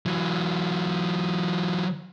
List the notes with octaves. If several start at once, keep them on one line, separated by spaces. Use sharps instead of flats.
E3 F#3